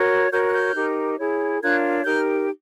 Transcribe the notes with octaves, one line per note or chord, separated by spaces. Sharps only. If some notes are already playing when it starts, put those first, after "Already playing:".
Already playing: F#4 A#4 C#5
F#4 A#4 C#5 F6 G6
F#6
F6 G6
D#4 G4 A#4
E4 G#4 C#5
D4 F4 A#4 C#5 F#6 G#6
D#4 G4 A#4 F6 G6